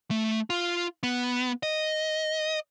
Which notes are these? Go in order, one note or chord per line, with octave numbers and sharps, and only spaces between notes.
A3
F4
B3
D#5